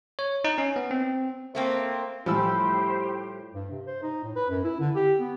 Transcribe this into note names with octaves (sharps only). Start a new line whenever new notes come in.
C#5
D#4
C#4
B3
C4
A3 A#3 C4 C5
A2 F3 G3 E4 G4 C5 E6
G2
C3
C5
D#4
A2
B4
F#2
E4
D3
G4
B3